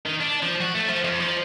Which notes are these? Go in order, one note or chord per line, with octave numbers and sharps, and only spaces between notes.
D#3
D4
F3
F#4
A3
F3
F2
F3